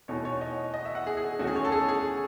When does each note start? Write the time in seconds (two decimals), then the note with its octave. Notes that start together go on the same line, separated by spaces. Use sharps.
0.08 E2 B2 A3 D#4 C#5
0.25 C#5
0.41 D#5
0.74 D#5
0.85 E5
0.95 F#5
1.07 G#4
1.17 G#4
1.39 E2 D#3 A3 C#4 F#4
1.47 G#4
1.56 C#5
1.65 A4
1.72 G#4
1.88 G#4